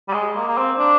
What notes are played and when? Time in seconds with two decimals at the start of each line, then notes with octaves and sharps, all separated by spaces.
0.09 G3
0.14 G#3
0.36 A#3
0.48 A#3
0.58 C4
0.79 D4